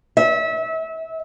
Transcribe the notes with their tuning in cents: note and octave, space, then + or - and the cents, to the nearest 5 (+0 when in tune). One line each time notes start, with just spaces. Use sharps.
E5 -30